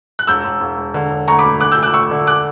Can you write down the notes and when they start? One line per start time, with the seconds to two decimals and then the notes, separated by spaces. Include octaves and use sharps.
0.19 F#6
0.27 E1 E6 G6
0.45 E1
0.61 E1
0.78 E1
0.94 D3
1.11 E1
1.28 D2 A#5 C#6
1.39 B5 D6
1.44 D2
1.60 D3 D6 F#6
1.72 E6 G6
1.77 D2
1.83 D6 F#6
1.94 D2 C#6 E6
2.11 D3
2.27 D6 F#6